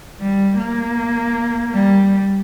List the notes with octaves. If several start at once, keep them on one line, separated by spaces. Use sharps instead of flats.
G3
A#3
G3